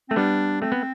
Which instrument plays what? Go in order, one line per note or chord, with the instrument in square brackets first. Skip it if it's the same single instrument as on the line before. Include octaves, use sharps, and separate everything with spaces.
[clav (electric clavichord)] A3 [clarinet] C4
[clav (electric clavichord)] G3 B3 [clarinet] D4
[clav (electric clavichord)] A3 [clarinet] C4
[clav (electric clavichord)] B3